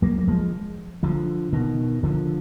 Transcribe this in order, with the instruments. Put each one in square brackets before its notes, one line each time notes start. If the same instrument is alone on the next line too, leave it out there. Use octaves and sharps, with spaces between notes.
[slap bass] F#3 A#3
A#3
F3 G#3
D3 F3
B2 D#3
D3 F3